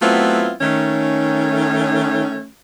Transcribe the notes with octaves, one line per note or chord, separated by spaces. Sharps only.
F#3 A3 B3 C4 E4 F4
D#3 A3 C#4